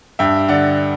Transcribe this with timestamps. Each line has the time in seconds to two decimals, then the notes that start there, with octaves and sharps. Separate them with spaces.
0.19 G2 E5 G5
0.48 D3 D5 F#5